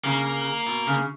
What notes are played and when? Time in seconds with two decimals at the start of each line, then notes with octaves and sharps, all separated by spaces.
0.04 C#3 A#3
0.66 B2
0.87 C#3